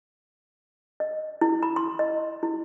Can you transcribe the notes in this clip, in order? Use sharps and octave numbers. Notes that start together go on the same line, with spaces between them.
D#5
E4
B5
C6
D#5
E4